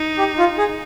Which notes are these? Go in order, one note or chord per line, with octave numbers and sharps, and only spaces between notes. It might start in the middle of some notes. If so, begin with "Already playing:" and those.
Already playing: D#4
G4
F4
G#4